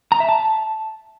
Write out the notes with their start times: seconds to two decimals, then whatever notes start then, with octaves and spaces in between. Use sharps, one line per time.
0.12 A#5
0.20 E5
0.29 A5